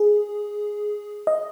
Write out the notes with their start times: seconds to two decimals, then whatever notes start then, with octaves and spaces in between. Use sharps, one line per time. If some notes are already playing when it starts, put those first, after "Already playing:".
Already playing: G#4
1.27 D#5